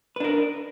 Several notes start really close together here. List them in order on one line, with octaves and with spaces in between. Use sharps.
B4 D4 A#4